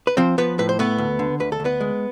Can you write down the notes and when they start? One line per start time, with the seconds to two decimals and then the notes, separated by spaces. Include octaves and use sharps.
0.07 B4
0.17 F3 C4 C5
0.38 F3 B3 B4
0.59 A2 B4
0.69 C5
0.79 A3 B3 B4
0.98 D2
1.19 D3
1.40 D2 B4
1.52 A4
1.60 D2
1.65 B3 B4
1.80 G#3